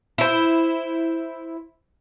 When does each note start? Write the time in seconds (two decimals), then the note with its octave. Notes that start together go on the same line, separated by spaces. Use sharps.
0.18 E4 C5